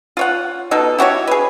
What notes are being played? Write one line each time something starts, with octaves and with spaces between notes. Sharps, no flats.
F4 C#5 F#5
B2 D#4 A4
E4 F#4 G4 C#5
G#4 B4